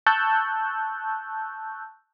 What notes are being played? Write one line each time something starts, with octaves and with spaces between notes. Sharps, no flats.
A5 C#6 E6 F#6 G6